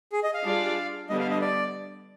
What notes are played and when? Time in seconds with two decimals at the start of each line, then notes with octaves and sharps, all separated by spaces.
0.12 G#4
0.23 D#5
0.34 F5
0.45 G3 D4 F4 G#4 D5
1.09 D3 G3 B3 D4 D#5
1.20 F5
1.31 D#5
1.42 D5